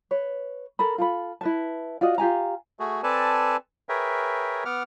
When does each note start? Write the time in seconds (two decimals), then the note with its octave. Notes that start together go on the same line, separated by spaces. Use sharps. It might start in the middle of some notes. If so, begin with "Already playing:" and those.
0.11 B4 C#5
0.79 A4 A#4 B5
0.98 F4 A4 B5
1.41 E4 B4 A5
2.01 F4 F#4 D5 D#5
2.18 F4 G4 G#5 A#5
2.79 A3 F#4 G#4
3.03 C4 A4 B4 D5 G#5 A5
3.89 G#4 A#4 B4 C#5 E5 G5
4.65 B3 F#5 D6 F6